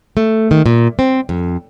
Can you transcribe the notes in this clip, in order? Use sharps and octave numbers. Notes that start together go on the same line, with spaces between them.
A3
D#3
A#2
C4
F2